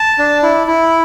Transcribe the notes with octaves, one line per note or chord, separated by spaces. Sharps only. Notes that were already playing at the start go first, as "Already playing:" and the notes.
Already playing: A5
D4
E4
E4